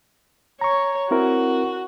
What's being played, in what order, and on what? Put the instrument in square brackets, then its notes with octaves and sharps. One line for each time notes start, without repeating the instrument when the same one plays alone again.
[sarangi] C#5 [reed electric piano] A#5 C#6
[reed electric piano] C4 E4 A#4 [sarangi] F#4